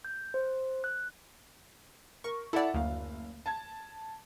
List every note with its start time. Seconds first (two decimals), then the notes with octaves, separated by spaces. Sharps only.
0.05 G6
0.34 C5
0.84 F#6
2.24 A#4 C#6
2.53 E4 A4 D5 E5 F#5
2.74 F#1 D2 F5
3.46 A5 G#6